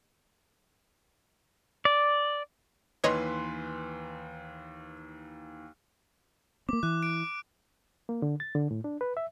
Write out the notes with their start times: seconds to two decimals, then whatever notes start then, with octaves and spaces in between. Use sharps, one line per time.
1.85 D5
3.04 D#2 E3 B4 C#5 D#5 B5 C6
6.69 A#3 C4 D6
6.83 E3 F#6
7.03 D7
8.09 A#3
8.22 D3
8.40 A6
8.55 D3
8.71 A2
8.84 D4
9.01 B4
9.17 E5